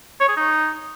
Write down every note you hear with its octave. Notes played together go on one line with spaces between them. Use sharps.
C#5
G#4
D#4